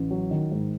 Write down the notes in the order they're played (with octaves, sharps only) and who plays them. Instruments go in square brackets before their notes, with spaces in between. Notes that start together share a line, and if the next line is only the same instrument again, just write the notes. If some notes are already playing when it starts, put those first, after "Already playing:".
Already playing: [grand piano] A1
F#3
D#3
G#2